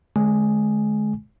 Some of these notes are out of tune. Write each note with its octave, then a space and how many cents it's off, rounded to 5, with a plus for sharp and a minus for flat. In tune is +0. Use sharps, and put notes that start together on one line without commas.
D3 +20 G#3 +30 G#5 +0